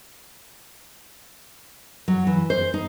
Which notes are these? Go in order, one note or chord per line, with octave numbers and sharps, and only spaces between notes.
F#3
E3
C5
D#4